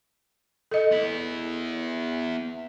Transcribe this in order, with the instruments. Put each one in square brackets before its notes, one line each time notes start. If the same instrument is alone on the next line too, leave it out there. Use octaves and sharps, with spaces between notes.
[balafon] A4 D#5
[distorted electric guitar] B3 E4